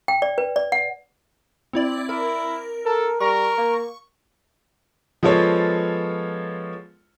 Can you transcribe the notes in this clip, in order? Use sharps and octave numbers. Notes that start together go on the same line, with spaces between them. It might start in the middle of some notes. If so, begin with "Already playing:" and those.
G5
D5
B4
D5
F#5
C4 E4 D5
E4 A#4
A4 A#4
G3 A#4 C#6
A#3
F3 G#3 B3 F4 A4 C#5